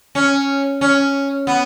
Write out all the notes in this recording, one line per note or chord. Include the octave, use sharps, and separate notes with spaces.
C#4
C#4
B3